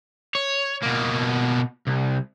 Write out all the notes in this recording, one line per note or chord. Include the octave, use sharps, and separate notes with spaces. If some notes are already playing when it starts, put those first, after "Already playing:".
C#5
B2 A#3
C2